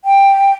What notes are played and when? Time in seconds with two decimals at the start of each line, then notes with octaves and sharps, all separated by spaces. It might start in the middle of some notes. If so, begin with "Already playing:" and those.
0.05 G5